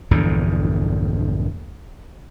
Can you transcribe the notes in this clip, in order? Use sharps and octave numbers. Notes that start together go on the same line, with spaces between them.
A#1 E2 G2 D3